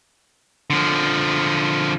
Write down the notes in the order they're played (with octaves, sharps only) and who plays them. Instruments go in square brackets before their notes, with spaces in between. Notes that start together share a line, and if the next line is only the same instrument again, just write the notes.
[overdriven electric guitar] D3 F3